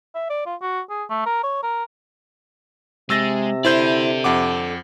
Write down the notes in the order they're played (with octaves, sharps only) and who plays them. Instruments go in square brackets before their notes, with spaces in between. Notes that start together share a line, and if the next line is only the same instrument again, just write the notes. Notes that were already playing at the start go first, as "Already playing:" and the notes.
[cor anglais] E5
D5
F4
F#4
G#4
A3
A#4
C#5
A#4
[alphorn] C3 [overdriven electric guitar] G#3 [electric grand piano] E6 A6 A#6
[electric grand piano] E4 C5 G6 [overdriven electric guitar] A4 D5
[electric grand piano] F2 F#5 D6